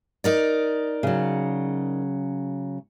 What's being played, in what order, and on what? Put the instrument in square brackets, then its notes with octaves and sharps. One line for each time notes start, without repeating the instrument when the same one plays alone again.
[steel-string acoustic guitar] D#4 A#4 D5
[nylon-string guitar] C#3 F#3